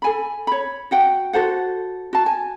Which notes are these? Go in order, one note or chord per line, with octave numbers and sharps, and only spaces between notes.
A4 G#5 B5
C#5 B5
F#4 F#5 G5
F#4 A4 C5 F#5
F#4 A5
G#5